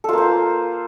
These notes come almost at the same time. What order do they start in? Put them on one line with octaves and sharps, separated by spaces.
A4 F4 A#3 C5